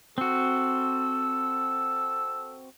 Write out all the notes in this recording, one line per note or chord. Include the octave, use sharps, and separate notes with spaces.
C4 F#4 A4